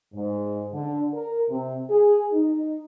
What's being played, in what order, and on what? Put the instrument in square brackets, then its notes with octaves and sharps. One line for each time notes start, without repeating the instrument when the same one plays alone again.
[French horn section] G#2
D3
A#4
C3
G#4
D#4